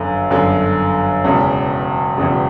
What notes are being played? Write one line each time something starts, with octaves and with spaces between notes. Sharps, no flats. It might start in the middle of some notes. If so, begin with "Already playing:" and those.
Already playing: G1 F#2 D3
G1 F#2 D3
E1 E2 C#3
E1 E2 C#3